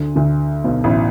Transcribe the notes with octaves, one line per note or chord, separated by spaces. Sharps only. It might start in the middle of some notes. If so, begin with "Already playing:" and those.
Already playing: D2 D3
D2 D3
B1 B2
A1 A2